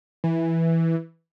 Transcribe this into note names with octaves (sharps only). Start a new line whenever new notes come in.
E3